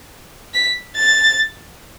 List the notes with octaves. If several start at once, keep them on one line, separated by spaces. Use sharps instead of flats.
B6
A6